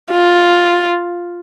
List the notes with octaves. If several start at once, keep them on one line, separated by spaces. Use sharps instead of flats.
F4